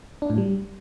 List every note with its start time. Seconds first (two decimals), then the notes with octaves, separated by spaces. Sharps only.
0.22 D4
0.30 A2
0.38 G3